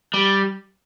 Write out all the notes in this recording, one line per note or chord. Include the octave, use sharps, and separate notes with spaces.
G3